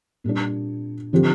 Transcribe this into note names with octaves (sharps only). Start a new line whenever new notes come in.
A#2 G3 A#3 D4
D3 F3 C4 G4